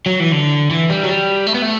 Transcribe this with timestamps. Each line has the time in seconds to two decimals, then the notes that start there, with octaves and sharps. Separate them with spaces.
0.06 F#3
0.20 E3
0.32 D3
0.70 E3
0.90 G3
1.04 F#3
1.09 G3
1.47 A3
1.55 B3
1.63 A3